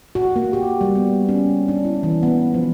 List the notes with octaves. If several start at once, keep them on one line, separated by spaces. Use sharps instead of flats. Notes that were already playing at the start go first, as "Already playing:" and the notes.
F#4
A#3
G4
G3
B3
C#4
D4
E4
E3
B3
F3